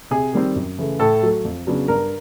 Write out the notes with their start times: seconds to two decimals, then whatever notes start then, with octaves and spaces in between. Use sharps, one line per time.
0.11 C3 G#4
0.33 D#3 G3 C4
0.56 F#2
0.78 C#3 E3 A3
0.99 A2 A4
1.23 F#3 A3
1.45 F2
1.67 C#3 F#3 B3 D4
1.88 G2 A#4